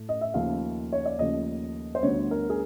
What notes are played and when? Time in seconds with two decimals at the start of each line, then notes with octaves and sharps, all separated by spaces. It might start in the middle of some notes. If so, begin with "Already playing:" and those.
Already playing: A2 A3
0.09 D#5
0.21 E5
0.34 D#2 C#3 F3 A3 F5
0.92 C#5
1.06 D5
1.18 D#2 C#3 F3 A3 D#5
1.95 C5
2.03 D2 D3 G3 B3 C#5
2.31 A#4
2.50 G#4